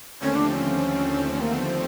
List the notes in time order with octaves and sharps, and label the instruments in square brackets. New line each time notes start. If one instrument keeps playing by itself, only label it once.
[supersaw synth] D#2 D3 F3 A3 C4 [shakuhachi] C#4
[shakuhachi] D4
D4
C#4
A#3
B3
C4